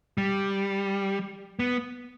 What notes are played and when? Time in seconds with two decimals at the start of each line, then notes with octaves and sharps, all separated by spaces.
0.18 G3
1.59 B3